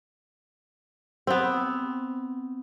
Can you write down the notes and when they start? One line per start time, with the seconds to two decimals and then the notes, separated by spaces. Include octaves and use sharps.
1.27 B3 C4